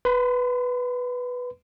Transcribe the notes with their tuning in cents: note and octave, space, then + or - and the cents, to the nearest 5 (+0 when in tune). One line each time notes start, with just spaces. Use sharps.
B4 +0 C6 -40